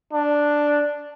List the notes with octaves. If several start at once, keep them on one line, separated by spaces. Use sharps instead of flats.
D4